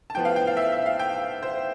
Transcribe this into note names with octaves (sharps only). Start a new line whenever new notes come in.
A5
A2 F3 B3 G5
F5
G5
F5
E5
E5
F5
G5
C5